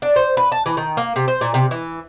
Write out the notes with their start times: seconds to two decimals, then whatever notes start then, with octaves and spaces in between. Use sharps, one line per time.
0.02 D4
0.16 C5
0.37 B4
0.52 A5
0.66 E3
0.77 D#3
0.97 A#3
1.16 C3
1.28 C5
1.41 A#2
1.54 C3
1.71 E3